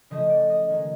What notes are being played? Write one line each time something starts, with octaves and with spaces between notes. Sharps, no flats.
C#3 F3 A3 C#4 D#5
D5
D#5
D#3 G#3 C#4